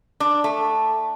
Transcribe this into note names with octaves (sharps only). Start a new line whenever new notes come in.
D4
A3